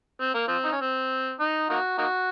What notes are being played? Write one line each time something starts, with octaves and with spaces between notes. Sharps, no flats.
C4
A#3
F3 C4
D#4
C#4
C4
D#4
A#3 D#4 F#4
A#3 D#4 F#4